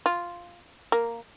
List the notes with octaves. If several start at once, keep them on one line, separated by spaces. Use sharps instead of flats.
F4
A#3